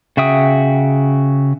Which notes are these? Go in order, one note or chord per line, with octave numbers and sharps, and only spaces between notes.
C#3 F#4 E5 G5 D#6